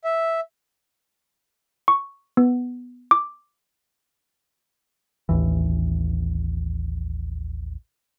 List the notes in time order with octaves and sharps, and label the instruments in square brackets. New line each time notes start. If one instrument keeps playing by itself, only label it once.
[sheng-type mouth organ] E5
[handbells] C#6
B3
D6
[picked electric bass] A1 D#2 E3